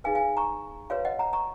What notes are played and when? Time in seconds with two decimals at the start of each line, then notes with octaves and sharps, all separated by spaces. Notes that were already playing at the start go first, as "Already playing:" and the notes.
0.04 D#4 G#4 B4 F5 G#5
0.15 F5 G#5
0.37 A#5 C#6
0.90 F#4 B4 C#5 F5
1.05 D#5 F#5
1.19 F#5 A#5
1.33 A#5 C#6